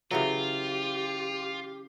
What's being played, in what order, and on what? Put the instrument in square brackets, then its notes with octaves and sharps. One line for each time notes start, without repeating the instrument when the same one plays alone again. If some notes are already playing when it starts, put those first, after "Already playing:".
[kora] C#3 E3 F#3 [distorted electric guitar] F4 [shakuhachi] G4